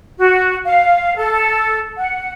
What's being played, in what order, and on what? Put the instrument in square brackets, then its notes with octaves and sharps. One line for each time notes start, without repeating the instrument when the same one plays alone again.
[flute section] F#4
F5
A4
F#5